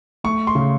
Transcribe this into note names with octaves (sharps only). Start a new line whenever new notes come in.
A3 C#6
C6
C#3